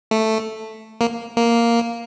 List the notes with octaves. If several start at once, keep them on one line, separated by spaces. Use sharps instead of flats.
A3
A#3
A#3